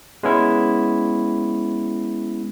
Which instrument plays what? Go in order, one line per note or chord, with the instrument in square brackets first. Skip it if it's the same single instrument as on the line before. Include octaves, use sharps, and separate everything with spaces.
[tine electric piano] G#3 B3 C#4 E4